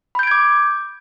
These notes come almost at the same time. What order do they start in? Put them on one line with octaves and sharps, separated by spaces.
B5 G6 D7 G#6 D6